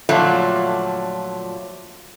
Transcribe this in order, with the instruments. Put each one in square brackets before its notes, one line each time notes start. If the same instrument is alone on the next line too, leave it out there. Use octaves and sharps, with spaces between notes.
[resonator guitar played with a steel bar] A#2 D3 F3 F#3 A3